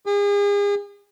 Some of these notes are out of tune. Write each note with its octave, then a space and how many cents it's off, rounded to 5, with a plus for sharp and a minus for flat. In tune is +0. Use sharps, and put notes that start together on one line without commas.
G#4 -40